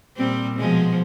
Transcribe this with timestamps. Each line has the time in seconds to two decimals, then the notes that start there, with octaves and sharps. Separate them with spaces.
0.17 A#2 G3 C4
0.59 B2 F3 G#3